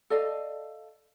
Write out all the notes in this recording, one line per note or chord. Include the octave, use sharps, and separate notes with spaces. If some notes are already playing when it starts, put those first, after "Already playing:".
A4 D5 D#5 F5